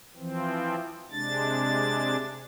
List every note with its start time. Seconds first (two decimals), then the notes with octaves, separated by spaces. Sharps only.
0.17 E3 F3 C4
1.12 C3 G#3 D4 A6